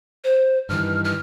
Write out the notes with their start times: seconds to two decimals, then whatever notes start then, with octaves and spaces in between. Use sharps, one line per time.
0.24 C5
0.69 G2 D#3 E3 F6
1.05 F6